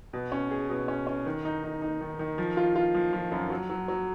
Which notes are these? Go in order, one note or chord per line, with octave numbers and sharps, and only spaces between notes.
B2
C#4
G#4
B2
C#4
C#4
D#3
D#4
D#4
D#4
D#3
D#3
F3
F4
F4
F3
F3
F#2
F#3
F#3
F#3